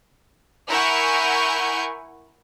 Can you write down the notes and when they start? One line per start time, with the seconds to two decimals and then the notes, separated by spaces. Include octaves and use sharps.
0.67 E4 A#4 F#5 G#5 C#6 G6